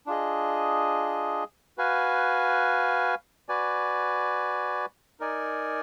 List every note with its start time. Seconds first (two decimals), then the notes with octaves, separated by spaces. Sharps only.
0.06 D4 F4 G#4 D#5
1.78 F#4 B4 F5 G#5
3.49 F#4 B4 D5 G#5
5.20 D#4 A#4 D5 G#5